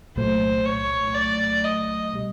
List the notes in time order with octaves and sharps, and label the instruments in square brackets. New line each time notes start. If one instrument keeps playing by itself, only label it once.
[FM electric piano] C2 A#2 F#3 A3 [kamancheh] C5
[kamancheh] C#5
D5
D#5
[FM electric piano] B2 G3